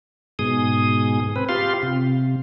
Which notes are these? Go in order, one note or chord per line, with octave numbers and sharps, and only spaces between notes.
G#2 B2 G#4 D#6
C4 B4
F4 G4 F5 C6
C3